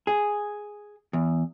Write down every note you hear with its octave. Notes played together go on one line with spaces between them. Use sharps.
G#4
E2